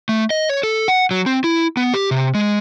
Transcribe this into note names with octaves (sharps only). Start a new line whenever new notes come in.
A3
D#5
C#5
A4
F#5
F#3
C4
E4
B3
G4
C3
G#3